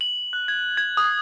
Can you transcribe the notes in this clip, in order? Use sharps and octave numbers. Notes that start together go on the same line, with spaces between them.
F#7
F#6
G#6
G#6
D#6